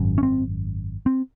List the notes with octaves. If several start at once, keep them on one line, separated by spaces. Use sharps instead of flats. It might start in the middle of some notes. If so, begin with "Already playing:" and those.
Already playing: G#1 F#2
C#4
C4
C4